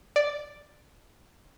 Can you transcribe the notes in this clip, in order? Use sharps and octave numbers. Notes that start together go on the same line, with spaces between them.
D5